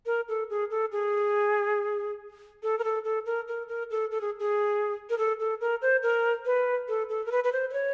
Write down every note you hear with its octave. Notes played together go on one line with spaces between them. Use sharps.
A#4
A4
G#4
A4
G#4
A4
A#4
A4
A4
A#4
A#4
A#4
A4
A4
G#4
G#4
A#4
A4
A4
A#4
C5
A#4
B4
A4
A4
A#4
B4
B4
C5
C5
C#5